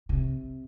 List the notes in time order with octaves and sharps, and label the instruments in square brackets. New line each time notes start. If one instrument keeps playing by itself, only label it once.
[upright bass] C3